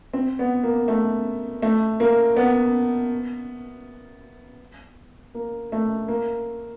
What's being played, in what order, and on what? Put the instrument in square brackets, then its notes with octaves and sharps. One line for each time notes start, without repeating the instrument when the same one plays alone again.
[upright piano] C4
B3
A#3
A3
A3
A#3
B3
A#3
A3
A#3